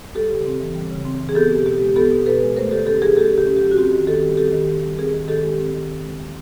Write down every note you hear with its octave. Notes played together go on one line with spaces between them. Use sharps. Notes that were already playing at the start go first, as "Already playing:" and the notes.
G3 G4 A4
C#3
C4
E3
G3
C#3
C4
E3
G#4
B3 G4 A4
B2
B2 G4
G#3
B3 G4 A4
B2
B2 A4 B4
G#3
A3 A#4 C5
D3 G4 A4
C#4 G4 A4
F#3 G#4 A#4
A3 G4 A4
D3
G4
C#4
G4
F#3
F#4
C4 G4
D#3
D#3 G4 A4
G3
C4 G4 A4
D#3
D#3
G3
C4 G#4 A#4
D#3
D#3 G4 A4
G#3
C4
D#3
D#3
G#3
A#3